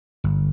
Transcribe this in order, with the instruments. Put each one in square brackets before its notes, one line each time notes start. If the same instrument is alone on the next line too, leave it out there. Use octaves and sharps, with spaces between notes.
[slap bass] G1